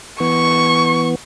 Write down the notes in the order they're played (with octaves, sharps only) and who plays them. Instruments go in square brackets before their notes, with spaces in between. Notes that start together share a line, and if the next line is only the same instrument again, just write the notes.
[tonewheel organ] E3 B3 [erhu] C#6